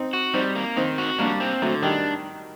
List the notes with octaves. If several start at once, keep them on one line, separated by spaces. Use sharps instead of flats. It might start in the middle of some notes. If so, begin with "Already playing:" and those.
Already playing: C4 D#4
F#4
G3 C4 D#4
A#3
D#3 C4 D#4
F#4
G3 A#3 D4
C4
D3 F#3 A3
D#3 G3 D4